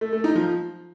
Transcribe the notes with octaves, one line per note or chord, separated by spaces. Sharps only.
A3
A3
D#4
F3